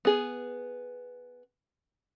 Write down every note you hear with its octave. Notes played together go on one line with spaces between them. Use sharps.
B3 G#4